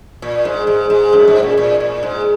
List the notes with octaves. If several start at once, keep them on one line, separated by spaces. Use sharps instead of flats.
A#2
G#2
G#2
G#2
F#2
G#2
A#2
A#2
A#2
G#2